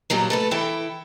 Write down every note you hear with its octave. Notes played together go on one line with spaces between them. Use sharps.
G2 A#2 F#3 G3
A3 A4 B4
E3 E4 A4 G5